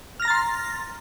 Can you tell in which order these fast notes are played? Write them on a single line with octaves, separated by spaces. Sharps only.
F6 A#6 A#5 A6 C6